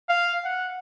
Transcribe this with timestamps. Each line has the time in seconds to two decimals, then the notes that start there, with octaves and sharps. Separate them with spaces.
0.08 F5
0.44 F#5